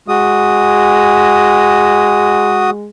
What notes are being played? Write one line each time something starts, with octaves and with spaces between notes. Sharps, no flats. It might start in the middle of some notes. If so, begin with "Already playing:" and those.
G#3 F#4 D#6